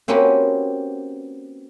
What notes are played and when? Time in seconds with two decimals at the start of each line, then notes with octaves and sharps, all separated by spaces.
0.08 A#3 C4 C#4 F#4 G4 B4